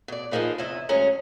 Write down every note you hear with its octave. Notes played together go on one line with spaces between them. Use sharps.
B2 D5
F3 A#3 C4 D#4 G#4 B4
E2 C3 E4 D#5
D2 F#3 G#3 C#4 A#5